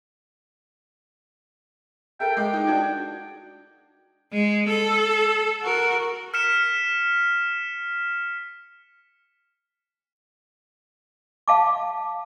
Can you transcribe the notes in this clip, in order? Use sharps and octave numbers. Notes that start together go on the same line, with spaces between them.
A4 A#4 E5 G5
G#3 G5 D6
D#4
D4 F#4 G#6
G#3
A4
F#4 A#4
F6 B6 C#7 E7
F5 A5 D6